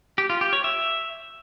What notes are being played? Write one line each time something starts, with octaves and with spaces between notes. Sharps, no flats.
G4
F4
G4
C#5
E5